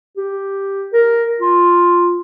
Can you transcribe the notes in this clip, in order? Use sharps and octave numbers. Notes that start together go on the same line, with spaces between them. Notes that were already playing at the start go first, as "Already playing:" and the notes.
G4
A#4
F4